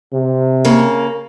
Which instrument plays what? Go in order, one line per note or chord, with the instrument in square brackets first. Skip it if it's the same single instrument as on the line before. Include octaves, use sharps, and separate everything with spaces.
[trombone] C3
[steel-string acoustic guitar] C#3 A#3